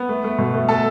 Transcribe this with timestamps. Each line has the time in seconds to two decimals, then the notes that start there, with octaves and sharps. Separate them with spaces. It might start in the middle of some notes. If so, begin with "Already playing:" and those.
Already playing: B3
0.09 A3
0.24 A3
0.39 B2
0.54 A3
0.69 A3 A4 A5